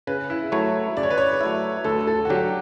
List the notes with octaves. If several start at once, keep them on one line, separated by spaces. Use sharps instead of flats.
C#3 B4
E4
F#3 A3 E4 C#5
C#3 D5
C#5
B4
C#5
F#3 A3 E4
D2 A4
A4
F#4
D3 F#3 G4